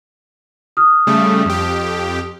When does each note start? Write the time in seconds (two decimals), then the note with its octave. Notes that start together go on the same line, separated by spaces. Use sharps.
0.77 D#6 F6
1.07 C#3 G3 A3
1.45 F2 G4